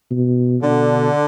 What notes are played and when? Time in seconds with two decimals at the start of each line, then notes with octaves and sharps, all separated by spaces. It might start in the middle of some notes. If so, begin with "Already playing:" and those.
0.11 B2
0.62 B2 D3